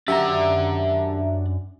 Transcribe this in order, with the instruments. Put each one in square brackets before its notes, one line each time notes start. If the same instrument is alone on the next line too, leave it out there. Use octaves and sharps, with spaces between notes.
[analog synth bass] F#2 [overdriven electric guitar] D4 F#5 [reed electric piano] G4 [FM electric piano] E5 A#5